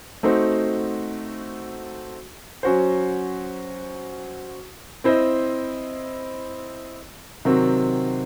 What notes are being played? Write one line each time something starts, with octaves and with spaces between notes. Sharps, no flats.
A3 C4 D#4 F#4 C5
F#3 C#4 F#4 C5
C4 E4 C5 D#5
C3 D#3 F#3 C4 F#4